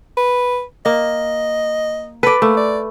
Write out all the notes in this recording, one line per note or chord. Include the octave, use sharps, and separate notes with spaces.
B4
A#3 D#5
A4 B4 D5
A3 A#3
D5